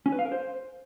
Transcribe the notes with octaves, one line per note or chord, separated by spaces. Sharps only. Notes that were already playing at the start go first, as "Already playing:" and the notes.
C#4
B4
F5
A#4
C5